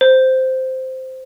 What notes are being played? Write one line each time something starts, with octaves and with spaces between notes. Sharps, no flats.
C5